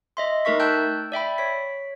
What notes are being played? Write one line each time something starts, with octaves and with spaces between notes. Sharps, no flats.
D#5 E5 C6
A3 D#4 A#4 E5 C#6 B6
G5 A5 E6 F#6 G6
D5 E5 G5 B5
C#5 B6